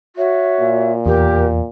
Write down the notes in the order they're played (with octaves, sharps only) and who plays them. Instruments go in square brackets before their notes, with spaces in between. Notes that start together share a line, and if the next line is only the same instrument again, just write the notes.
[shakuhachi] F#4 [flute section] C#5 E5
[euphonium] A#2
[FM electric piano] E2 [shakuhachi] G4 [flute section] A#4